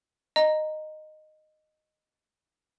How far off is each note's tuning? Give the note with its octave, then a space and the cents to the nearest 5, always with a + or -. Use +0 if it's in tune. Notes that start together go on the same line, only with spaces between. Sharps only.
D#5 -10 A#5 +0